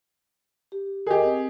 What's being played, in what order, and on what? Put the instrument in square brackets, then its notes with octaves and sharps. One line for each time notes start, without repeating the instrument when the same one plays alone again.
[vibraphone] G4
[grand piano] G4 G#4 [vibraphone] A#4 D#5
[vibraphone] C4